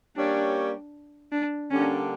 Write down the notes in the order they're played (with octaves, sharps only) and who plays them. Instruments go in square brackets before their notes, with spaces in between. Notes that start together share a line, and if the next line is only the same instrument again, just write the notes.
[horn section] G3 A#3 C#4 G4 C#5 [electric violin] D4
[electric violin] D4
[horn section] D3 G3 A#3 D4 [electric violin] C#4